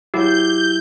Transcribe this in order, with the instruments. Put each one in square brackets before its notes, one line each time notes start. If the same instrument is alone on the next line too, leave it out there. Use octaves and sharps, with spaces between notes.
[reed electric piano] F#3 E4 E6 [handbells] G4 [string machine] G6